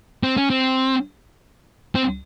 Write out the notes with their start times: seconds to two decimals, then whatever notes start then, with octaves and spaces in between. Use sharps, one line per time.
0.23 C4
0.37 C#4
0.50 C4
1.95 C4